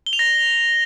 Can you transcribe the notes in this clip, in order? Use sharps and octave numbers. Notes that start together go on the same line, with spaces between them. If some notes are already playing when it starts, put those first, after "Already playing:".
G7
F7
A#6